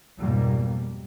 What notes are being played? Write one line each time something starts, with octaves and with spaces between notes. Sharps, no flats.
F2 G#2 B2 G3 A#3